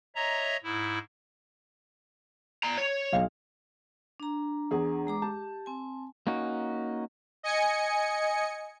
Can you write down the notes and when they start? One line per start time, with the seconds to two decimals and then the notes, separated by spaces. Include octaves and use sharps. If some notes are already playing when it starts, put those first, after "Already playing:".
0.16 C#5 D#5 E5 A#5
0.63 G#2 E4
2.63 D5 A#5
2.78 C#5
3.13 B1 F5
4.20 D4 A#5
4.71 E2 G#4
5.07 G#3 A#5 D6
5.22 G4 A5
5.66 C4 G#5
6.27 A#3 C#4 D#4 F#4
7.43 D#5 G#5 C#7